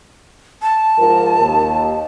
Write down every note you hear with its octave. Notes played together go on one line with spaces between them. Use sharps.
A5
G#2 F3 A#4
D#2